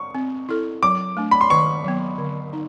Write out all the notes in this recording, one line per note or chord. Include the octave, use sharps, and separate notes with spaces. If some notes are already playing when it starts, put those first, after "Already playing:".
Already playing: C#6
C4
E4 A4
F#3 D6
A3 D4
B5
C6
D#3 C#6
F#3 B3
D3
D#4